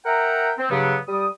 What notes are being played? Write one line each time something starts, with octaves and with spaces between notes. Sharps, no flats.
A#4 E5 F#5 G5 A#5
C4
G2 C#3 F#3 B3
G3 D#6